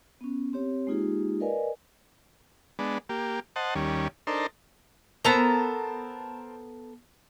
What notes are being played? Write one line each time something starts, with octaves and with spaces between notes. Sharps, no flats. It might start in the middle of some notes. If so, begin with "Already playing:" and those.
B3 C#4
C4 G4 C#5
G#3 A#3 D#4 F4 G4 G#4
A#4 B4 D5 D#5 F5 G#5
G#3 B3 D4
A#3 G4
C5 D#5 F#5 A5
D#2 G3 C#4
D4 D#4 A4 A#4 C5
B3 A4 A#4 C5 A5 A#5